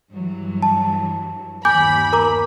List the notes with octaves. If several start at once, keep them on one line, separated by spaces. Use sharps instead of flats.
G2 E3 F#3
A5
G1 D#2 G#5 B5 D6 G6
A#4 A#5 D6